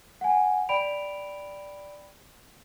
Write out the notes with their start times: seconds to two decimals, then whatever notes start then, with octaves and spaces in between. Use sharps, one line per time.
0.21 F#5 G#5
0.69 D5 G5 B5 D7 F7